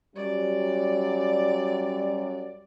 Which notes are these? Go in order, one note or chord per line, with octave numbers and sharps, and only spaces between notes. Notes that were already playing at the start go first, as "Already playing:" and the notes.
F#2 F#3 G3 D5